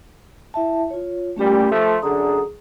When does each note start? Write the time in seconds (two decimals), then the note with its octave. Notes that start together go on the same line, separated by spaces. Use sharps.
0.54 E4 E5 A5
0.91 F4 C#5
1.36 A#2 G3 A3 C#4 G4
1.69 F3 A3 C6
2.02 F#2 D3 G#4 A#5 D#6